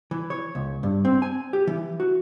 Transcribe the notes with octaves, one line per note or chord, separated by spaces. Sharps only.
E3
C#5
C#2
G2
C4
G#5
G4
E3
F#4